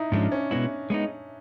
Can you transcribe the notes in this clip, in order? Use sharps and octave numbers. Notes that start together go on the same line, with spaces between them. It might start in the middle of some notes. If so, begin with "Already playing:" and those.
Already playing: D#4 E4
G#2 F3 G#3 C#4 D4
C#4
B2 G#3 B3 E4
G#3 B3 D#4